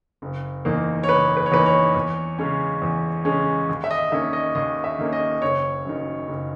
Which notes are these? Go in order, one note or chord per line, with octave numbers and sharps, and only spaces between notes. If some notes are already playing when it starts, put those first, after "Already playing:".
F#1
E2 D#3 A#3
C#5
F#1 B4
B4
C#5
E2 D#3 A#3 B4
C#5
E2
C#3 G#3 C#4
E2
C#3 G#3 C#4
D#2
E5
D#5
D#3 A#3 C#4 E5
D#5
D#2 D#5
E5
D#3 A#3 C#4
D#5
F#1 C#5
F#2 D#3
F#1